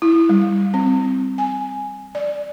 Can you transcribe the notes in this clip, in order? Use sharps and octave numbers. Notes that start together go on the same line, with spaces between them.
E4
G3
C4
G#5
D5